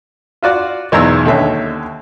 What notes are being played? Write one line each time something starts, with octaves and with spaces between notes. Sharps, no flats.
F4 F#4 D5
B1 E2 G#2 A#5 E6
D#2 D3 C#4 E5